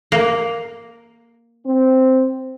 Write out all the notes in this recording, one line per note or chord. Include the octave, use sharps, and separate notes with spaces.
A#3
C4